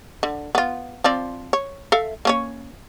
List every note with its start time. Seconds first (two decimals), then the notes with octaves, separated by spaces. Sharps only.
0.23 D3
0.55 B3 F4
1.04 F3 C4 D5
1.53 C#5
1.92 A4 E5 F5
2.25 A#3 C#4 C#5